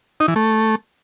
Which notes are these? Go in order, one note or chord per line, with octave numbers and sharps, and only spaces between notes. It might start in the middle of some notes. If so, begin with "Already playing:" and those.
D#4
E3
A3